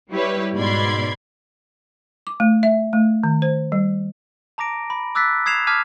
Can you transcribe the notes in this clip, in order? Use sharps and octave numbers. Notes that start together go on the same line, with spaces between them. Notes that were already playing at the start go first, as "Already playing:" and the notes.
G3 E4 G4 B4 C#5
G#2 B2 D5 B5 C6 G#6
D6
A3
E5
A3
D#3
C5
G3
A5 A#5 D6 A#6 D7
B5
D6 E6 F#6 A6 B6
D#6 G#6 C7 E7 F7
A5 D6 F6 G#6 B6 D#7